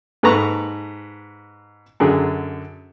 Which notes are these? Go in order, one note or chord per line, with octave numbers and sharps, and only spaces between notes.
G#2 A4 B4 A5 A#5 C#6
F#2 D3 G#4